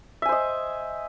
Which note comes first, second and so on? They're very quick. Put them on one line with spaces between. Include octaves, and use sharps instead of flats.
E5 G#5 C5 D#5